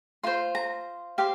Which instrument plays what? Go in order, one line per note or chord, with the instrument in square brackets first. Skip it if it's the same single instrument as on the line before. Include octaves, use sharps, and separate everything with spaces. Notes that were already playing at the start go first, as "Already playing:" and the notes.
[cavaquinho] F4 C5 C6
A#5
G4 C5 F5